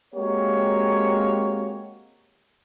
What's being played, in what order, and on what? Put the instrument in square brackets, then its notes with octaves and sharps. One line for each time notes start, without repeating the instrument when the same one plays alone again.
[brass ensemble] G#3 A#3 C4 F#4 G4 C#5